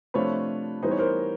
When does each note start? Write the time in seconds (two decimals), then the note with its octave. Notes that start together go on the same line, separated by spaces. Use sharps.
0.14 C3 F3 A3 D4 F4 B4 C#5
0.83 E3 G3 B3 D#4 C5
0.91 C#5
0.99 A#4 C5